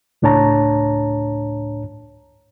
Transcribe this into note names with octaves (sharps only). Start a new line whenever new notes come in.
C#2 A2 D4 C#5 A5 A#5